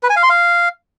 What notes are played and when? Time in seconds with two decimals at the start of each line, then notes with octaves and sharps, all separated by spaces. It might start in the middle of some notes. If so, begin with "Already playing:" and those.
0.03 B4
0.10 G#5
0.16 F5
0.23 C6
0.30 F5